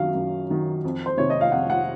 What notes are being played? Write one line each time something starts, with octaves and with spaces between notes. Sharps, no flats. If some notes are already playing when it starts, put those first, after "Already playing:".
Already playing: F#2 D#3 F#3 F5
F#2
D#3 F#3
F2
C5
C3 D#3 C#5
D#5
F5
F2 F#5
F#5